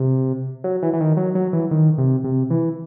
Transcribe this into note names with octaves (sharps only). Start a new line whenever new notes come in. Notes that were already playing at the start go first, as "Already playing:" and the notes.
Already playing: C3
F#3
E3
E3
D#3
F#3
F#3
E3
D#3
C3
C3
E3